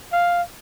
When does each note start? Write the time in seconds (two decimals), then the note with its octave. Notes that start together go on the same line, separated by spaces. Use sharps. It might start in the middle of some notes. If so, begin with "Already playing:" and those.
0.13 F5